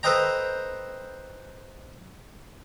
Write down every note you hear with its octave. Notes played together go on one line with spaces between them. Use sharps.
A4 B4 C5 D#5 G5 A#5